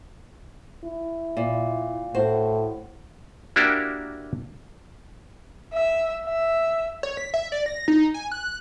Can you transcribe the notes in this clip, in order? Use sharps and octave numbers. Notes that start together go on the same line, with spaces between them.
E4
A#2
A2 F#4 C5
A#3 D4 E4 F#4 G4 A#4
E5
E5
C#5
B6
E5
D5
A#6
D#4
G#5
F#6